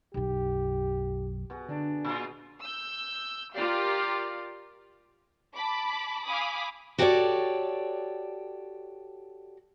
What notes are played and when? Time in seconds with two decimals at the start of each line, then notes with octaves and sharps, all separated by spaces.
0.14 B1 F#2 G4
1.50 B2 F#4 G#4
1.69 D3 D4
2.05 A#2 F4 F#4 G#4
2.61 E6 G6
3.53 F4 G4 A#4 D5 F5
5.56 A5 B5 D6
6.25 F5 G#5 B5 D6 D#6
6.98 F#4 G4 A4 A#4 C#5 D5